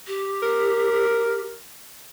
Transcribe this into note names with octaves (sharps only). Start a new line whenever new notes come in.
G4
A#4